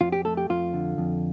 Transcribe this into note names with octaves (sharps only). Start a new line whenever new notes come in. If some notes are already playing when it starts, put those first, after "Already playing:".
F2 F4
G4
A3 A4
G4
F2 F4
D3
F2